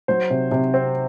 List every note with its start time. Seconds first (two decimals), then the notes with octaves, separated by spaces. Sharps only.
0.08 F#3 C5
0.30 C3
0.51 C3
0.74 C4